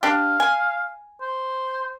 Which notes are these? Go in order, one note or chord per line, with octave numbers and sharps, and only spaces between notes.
D4 G4 F5
G#5
C5